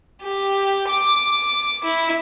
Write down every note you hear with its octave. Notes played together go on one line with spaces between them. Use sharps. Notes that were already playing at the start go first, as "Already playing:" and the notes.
G4
D6
E4